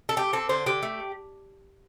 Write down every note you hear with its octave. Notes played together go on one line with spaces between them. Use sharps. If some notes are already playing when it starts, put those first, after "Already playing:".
A4
A3 G4
C4 A4
D3 C5
D3 G4
A3